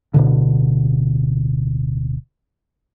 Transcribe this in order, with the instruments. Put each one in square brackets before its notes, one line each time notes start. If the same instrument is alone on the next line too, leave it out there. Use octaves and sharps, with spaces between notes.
[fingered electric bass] D1 B2 D3